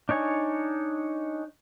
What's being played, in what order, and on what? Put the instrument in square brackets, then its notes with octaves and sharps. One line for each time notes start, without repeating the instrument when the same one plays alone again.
[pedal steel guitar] D4 D#4 C#5 G#5